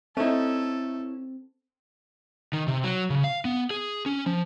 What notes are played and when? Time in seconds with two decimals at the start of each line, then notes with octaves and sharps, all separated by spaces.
0.17 A3 C4 C#4 D#4 E4 A4
2.53 D#3
2.68 C3
2.84 F#3
3.10 C#3
3.24 F5
3.45 B3
3.71 G#4
4.06 C#4
4.26 F3